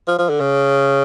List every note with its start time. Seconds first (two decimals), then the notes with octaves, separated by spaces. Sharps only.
0.08 F3
0.19 F3
0.29 D3
0.40 C#3